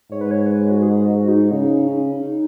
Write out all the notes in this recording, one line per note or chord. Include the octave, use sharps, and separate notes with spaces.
G#2 C#5
B4
C#5
B4
F#4
G#4
F#4
D#4
C#3 D#4
C#4
D#4